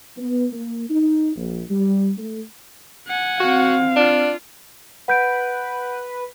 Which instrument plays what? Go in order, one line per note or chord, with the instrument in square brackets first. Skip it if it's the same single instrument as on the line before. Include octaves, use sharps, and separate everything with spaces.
[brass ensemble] B3
A#3
D#4
A#1
G3
A3
[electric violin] F#5 G#5
[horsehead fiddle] C4 F5 [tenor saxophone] F#4
[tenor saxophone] D4 [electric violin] F4
[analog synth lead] B4 [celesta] F#5 G6 D7